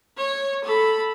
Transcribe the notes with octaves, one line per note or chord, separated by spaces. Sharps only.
C#5
A4 B5